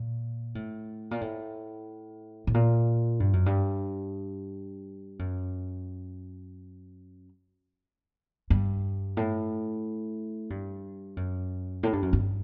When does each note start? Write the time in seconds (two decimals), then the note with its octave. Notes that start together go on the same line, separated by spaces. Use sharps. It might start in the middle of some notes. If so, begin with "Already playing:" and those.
Already playing: A#2
0.55 A2
1.11 A#2
1.21 A2
2.47 A2
2.54 A#2
3.20 G2
3.33 F#2
3.46 G2
5.19 F#2
8.50 G2
9.17 A2
10.50 G2
11.17 F#2
11.83 A2
11.93 G2
12.02 F#2
12.13 G2